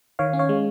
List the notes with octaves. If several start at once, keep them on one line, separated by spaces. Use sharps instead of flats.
D#3 C#5 F5
C#4
C#5 F5
G#3